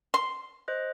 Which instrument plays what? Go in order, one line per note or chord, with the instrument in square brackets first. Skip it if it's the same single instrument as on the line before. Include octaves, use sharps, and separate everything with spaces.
[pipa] C6
[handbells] C5 D#5 F#6